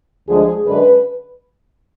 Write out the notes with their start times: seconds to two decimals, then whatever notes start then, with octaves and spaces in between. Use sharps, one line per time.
0.28 D2 D3 F3 G#3 G#4
0.66 F#2 D3 G#3 D4 B4